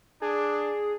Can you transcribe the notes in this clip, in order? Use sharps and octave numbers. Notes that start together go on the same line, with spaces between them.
D4 G#4